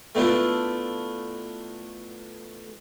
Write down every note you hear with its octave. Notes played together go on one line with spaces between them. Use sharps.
A3 B3 D4 E4 F4 A4